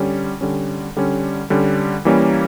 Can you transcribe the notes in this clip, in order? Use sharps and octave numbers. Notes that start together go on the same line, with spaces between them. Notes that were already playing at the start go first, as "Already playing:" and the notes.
Already playing: D3 G3 C#4
D3 G3 C#4
D3 G3 C#4
D3 G3 C#4
E3 G3 A#3 C#4